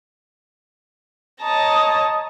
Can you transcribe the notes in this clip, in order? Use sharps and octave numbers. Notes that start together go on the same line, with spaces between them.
C#5 D#5 A5 A#5